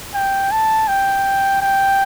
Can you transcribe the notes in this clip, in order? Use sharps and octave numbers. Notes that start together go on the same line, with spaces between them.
G5
A5
G5
G5